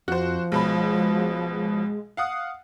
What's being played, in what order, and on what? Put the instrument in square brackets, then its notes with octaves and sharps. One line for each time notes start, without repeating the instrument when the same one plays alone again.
[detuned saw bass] F2 [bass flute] F3 [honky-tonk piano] F#4 C5
[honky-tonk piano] B1 B2 B5 [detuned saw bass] G#3
[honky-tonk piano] F5 F#5 D#6